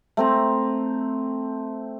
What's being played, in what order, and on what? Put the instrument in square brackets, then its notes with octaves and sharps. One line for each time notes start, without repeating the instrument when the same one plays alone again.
[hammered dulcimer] A3 C4 A#5